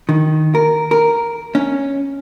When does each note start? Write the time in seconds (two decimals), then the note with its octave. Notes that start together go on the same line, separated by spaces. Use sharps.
0.09 D#3
0.55 A#4
0.91 A#4
1.55 C#4